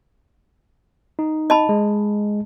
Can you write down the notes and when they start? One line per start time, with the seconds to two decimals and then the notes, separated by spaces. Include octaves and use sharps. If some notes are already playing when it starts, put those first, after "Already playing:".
1.19 D#4
1.50 D#5 A5 B5
1.69 G#3